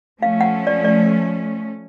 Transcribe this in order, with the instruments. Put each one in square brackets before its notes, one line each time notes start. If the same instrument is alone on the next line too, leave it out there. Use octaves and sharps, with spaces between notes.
[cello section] F3 A3 C#4 [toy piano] F5
[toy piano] F#5
D5
D5